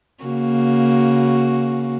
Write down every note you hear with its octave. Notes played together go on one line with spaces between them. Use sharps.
C#3 A#3 F#4